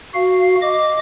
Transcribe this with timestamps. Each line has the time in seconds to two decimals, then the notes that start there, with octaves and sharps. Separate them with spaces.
0.14 F#4 F5
0.62 D#5 D6